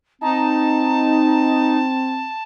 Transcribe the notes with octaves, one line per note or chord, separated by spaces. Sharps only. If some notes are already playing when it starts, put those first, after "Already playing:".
C4 D#4 A5